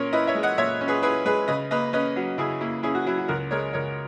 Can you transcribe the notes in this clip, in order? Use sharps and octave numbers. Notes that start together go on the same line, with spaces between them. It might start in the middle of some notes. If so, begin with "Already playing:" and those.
Already playing: A#2 C#4 A#4 C#5
E4 B4 D#5
C#5 E5
G#3
D#5 F#5
A#2 C#5 E5
C#4
G#4 B4
E4 G#4 B4
G#3 G#4 B4
C#3 B4 D#5
A#3 B4 D#5
C#4 B4 D#5
F#3
C#3 E4 G#4
A#3 E4
C#4 E4 G#4
F#4
F#3 E4
F#4
C#2 F#4 A#4
G#3 A#4 C#5
C#2 A#4 C#5